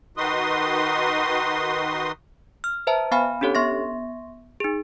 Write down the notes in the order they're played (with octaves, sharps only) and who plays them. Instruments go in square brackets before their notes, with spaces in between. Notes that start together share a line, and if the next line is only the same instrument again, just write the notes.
[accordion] D#3 D#4 F#4 B4 C6 D#6
[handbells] F6
B4 C5 E5 A5 A#5
B3 F5 G#5 B5 F6
C#4 D4 G4 A4 C#5
B3 E5 C6 C#6 A#6
D#4 G#4